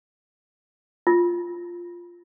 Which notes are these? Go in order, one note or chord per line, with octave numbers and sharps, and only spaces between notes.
F4